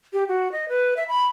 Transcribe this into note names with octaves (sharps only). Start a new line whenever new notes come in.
G4
F#4
D#5
B4
E5
B5